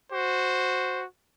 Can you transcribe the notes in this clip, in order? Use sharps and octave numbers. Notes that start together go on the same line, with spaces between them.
F#4 C5